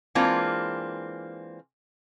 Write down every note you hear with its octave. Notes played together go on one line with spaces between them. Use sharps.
E3 G#3 A#3 C4 D4 F4